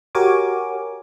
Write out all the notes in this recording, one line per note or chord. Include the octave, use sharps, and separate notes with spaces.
F#4 G4 A#4 C#5 G#5 D6